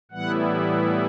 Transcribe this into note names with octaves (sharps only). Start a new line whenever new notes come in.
A2 E3 G3 B3 E4 F#5